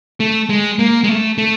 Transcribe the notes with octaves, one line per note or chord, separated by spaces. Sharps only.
A3
G#3
A#3
G#3
A3
A3